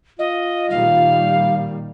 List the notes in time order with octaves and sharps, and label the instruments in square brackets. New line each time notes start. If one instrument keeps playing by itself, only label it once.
[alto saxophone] F4 [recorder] D#5
[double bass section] A#2 D#3 G3 [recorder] F5